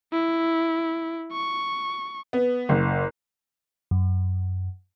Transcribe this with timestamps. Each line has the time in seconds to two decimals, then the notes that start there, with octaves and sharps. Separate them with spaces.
0.12 E4
1.33 C#6
2.33 B3
2.69 F#1
3.91 F#2